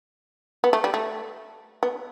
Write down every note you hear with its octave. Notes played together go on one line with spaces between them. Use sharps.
B3
A3
G3
A3
B3